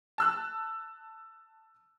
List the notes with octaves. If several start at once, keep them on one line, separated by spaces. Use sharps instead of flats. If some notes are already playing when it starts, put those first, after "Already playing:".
A5 E6 F#6